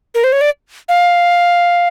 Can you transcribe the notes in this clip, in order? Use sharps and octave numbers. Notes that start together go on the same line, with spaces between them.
A#4
C5
C#5
D5
F5